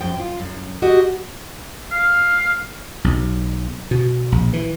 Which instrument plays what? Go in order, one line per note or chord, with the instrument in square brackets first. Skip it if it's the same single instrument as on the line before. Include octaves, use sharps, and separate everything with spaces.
[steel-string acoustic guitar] F#2 F3 G5
F4
F#2
F#4 G4 D#5
[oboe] F5
[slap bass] B1
B2
A#1
E3